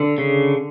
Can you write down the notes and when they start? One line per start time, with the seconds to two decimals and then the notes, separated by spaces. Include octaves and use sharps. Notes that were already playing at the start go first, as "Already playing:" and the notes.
Already playing: D3
0.18 C#3